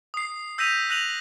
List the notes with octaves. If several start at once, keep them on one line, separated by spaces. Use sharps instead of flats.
D#6 C7
E6 G6 A#6 B6 D#7 F7
F#6 A#6 D#7 F7 F#7